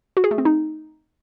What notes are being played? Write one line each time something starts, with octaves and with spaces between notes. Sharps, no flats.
F#4
G#4
A3
C4
D#4